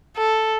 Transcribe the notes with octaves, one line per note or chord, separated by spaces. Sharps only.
A4